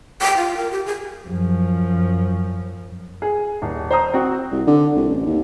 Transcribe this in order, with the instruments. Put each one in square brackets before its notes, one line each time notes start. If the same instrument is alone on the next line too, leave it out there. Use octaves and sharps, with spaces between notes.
[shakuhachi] G5
F4
A#4
G4
G#4
[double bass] F#2 F3
[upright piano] G#4
D#1
C5 A#5 D#6
C4 F#4
[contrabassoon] C2
D3
C2
A1
D#2